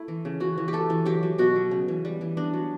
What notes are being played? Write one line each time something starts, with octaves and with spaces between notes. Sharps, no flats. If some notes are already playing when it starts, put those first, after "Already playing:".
Already playing: A3 E4
E3
C#3
E3 F#4
E3
G4
A3 A4
E3
F#3 G4
F#3
B2 F#4
F#3
C#3
E3
G3
E3
B3 D4
F#3